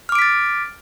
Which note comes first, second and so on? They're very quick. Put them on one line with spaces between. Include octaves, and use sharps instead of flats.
F6 D6 D7 B6 A6